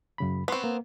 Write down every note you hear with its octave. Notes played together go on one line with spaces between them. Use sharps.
F#2 C#3 B5
B3 C4 B4 C6 C#6
A#3